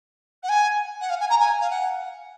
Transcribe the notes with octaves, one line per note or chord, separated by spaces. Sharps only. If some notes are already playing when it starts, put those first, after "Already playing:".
F#5
G#5
F#5
F5
G#5
A#5
G#5
F5
F#5